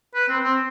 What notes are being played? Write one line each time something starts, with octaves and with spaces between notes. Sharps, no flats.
B4
C4
C4